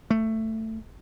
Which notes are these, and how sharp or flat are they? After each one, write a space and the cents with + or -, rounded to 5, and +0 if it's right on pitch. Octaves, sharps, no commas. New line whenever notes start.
A3 +10